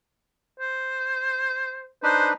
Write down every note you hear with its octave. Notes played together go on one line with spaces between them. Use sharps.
C5
D4 D#4 B4 C5